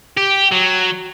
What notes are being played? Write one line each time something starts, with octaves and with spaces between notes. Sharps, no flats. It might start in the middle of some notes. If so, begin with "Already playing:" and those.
G4
F#3